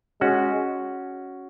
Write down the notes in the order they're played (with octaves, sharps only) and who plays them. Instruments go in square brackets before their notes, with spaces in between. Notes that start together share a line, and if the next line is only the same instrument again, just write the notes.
[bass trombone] G#3 [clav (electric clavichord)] C#4 F#4